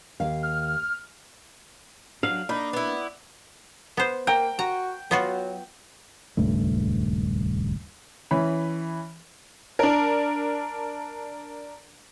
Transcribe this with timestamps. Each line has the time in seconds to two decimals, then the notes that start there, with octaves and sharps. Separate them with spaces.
0.20 D#2 F5
0.43 F6
2.23 F#3 D4 F#4 F5
2.49 A#3 D4 D#4 D5 B5
2.73 B3 E4
3.97 B3 C5
4.27 A#3 A#4 G5
4.59 F#4 A#5
5.11 F#3 B3 F4 F#4
6.37 D#1 C#2 G2 A3
8.31 E3 C#4 B5
9.79 D4 A#4